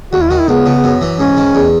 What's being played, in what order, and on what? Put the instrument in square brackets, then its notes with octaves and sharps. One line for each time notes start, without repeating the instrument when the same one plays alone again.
[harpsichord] D#2 [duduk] F#4
[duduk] E4
[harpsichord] D#3 [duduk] F#4
[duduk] E4
[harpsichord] C#2 [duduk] B3
[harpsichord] C#3
F#2
E3
[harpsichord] G#2 [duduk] C#4
[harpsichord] D#3
E2